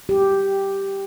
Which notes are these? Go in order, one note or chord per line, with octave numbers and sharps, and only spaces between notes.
G4